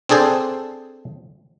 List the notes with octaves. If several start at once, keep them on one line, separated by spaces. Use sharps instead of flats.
C4 D4 G#4 A4 C5